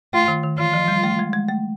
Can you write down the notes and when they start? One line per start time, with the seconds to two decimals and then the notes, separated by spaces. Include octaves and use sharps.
0.13 A3 F4
0.28 D#3
0.43 D#3
0.58 E3 F4
0.74 F3
0.88 G3
1.03 A3
1.19 G#3
1.33 G#3
1.48 A3